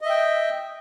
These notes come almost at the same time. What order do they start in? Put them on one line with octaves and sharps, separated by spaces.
D#5 E5 G5